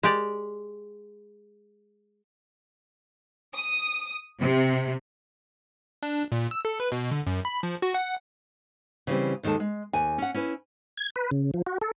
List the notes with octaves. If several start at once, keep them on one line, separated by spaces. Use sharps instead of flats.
G#3 G4 D5
D#6
C3
D4
A#2
E6
A4
B4
B2
D3
F#2
B5
F3
F#4
F#5
C#3 E3 G3 C4
D#2 D#3 G#3 A4 A5
G#3
D#2 G#5
C#4 F#5
C#4 E4 B4
G#6
B4
C#3
F3
F#4
A4